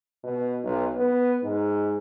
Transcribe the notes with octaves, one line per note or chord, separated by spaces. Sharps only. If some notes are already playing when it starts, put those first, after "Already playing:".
B2
B1
B3
G#2